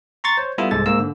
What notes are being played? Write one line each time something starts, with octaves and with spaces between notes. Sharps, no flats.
A#5 C6 C#6 A6
C5 C#5
G3 B3 E4 F4 A4
C2 G#2 G#3 A4 A6
G#2 A#3 E6
D3